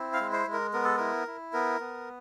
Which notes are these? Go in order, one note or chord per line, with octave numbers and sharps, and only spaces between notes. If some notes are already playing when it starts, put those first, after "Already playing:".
Already playing: C4 E4
F5
G#3
C5
G#3
A#4
B3 A#4
A4
E4 A#4
E4
B3 A#4
B3